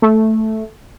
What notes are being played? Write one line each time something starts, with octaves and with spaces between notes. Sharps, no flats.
A3